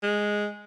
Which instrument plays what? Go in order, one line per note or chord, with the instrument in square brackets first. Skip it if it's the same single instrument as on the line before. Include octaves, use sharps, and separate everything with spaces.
[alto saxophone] G#3